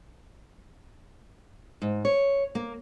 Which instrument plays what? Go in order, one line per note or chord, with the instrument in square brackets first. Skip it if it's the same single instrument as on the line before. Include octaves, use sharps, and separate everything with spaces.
[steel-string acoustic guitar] G#2
C#5
A#3